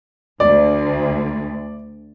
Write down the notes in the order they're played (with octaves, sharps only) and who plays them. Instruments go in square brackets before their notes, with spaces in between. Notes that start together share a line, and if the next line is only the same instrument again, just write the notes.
[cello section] D2 [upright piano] D5